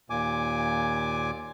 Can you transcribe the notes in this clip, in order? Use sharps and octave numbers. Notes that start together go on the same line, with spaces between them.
D#2 A#2 G#5 D6